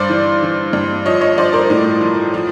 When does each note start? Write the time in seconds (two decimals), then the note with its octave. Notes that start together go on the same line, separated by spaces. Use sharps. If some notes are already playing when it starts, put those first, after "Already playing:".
Already playing: G2 C5 D5
0.09 E3
0.43 E3
0.73 G2
1.05 F3 C#5 D#5
1.21 C#5 D#5
1.37 F3 C5 D5
1.53 A#4 C5
1.70 A2
2.01 F3
2.34 F3